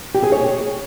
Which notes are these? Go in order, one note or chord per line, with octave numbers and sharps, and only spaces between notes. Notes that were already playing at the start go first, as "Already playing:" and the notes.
G4
G#4
C#5